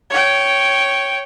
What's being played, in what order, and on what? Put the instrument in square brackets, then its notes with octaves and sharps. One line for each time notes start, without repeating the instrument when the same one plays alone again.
[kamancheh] C#5 G5